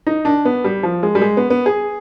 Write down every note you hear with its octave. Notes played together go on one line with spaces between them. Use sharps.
D#4
D4
B3
G3
F3
G#3
G3
G#3
B3
B3
G#4